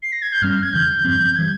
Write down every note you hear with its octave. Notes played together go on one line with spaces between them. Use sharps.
C7
A#6
G#6
G6
G2 G3 C#4 F6
G#6
E2 C#3 E3 G6
G2 F3 C4
E3 G3 G#6